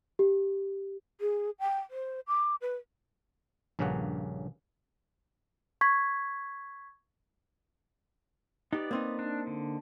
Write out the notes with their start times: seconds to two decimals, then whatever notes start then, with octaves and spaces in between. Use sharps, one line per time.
0.19 G4
1.21 G#4
1.59 G5
1.90 C5
2.28 D6
2.61 B4
3.79 A#1 G2 C#3 A#3 C#4 F#5
5.81 C#6 G#6 B6
8.73 B3 D#4 G4 D5
8.91 A#3 C4 D#4
9.19 D4
9.47 D3